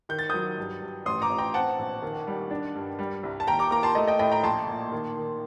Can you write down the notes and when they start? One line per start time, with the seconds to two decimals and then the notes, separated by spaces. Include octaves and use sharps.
0.09 D#3 G6
0.19 A6
0.30 F#3 D#6 G6
0.58 G2
0.82 G2
1.05 A1 C6 D#6
1.22 A#5 D6
1.29 A1
1.38 G5 A#5
1.54 C4 F#5 A5
1.79 A#1
2.02 D#3
2.27 G3
2.51 D4
2.75 G2
2.99 G3
3.23 C2
3.40 A5
3.47 D#2 G5 A#5
3.59 A#5 D6
3.71 A#3 A#5 D6
3.83 A5 C6
3.95 A3 D#5
4.07 D#5 G5
4.19 A2 D#5 G5
4.31 G5 A#5
4.43 A#1 A5 C6
4.68 A#2
4.92 D#3
5.17 D#3